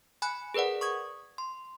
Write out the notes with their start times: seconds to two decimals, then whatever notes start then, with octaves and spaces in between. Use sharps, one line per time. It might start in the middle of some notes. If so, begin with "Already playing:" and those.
0.22 G#5 B5 F#6
0.54 G#4 A#4 B4 D5 F#5
0.81 C#6 D#6 G#6
1.38 C6